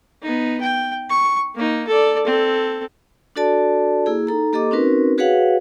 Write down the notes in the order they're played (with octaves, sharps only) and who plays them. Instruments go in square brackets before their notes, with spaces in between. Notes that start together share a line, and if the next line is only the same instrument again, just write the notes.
[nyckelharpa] B3 D#4
G5
C#6
A#3 D#4
A4 D5
C4 A4
[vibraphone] D4 F#4 A4 D5 A5
A#3 E4 G#4
D#4 A4 A#5
A#3 G4 A4 D#5 D6
C4 C#4 D#4 F#4 A#4 B4
F#4 G#4 B4 C#5 F5 F#5